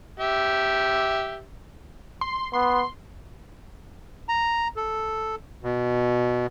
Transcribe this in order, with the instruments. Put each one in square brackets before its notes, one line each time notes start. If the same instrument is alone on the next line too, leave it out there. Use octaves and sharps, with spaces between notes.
[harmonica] G4 E5
[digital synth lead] C6
[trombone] B3 [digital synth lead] C6
[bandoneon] A#5
A4
B2